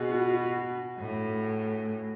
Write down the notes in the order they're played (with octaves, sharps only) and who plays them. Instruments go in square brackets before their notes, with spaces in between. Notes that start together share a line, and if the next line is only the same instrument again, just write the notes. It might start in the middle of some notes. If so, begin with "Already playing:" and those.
Already playing: [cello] B2 [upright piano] F#4 G#4
[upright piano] F#4
F#4
[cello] A2